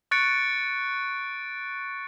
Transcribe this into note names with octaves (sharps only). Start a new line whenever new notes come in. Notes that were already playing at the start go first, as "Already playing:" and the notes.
C#6 F#6 A6 C#7 D7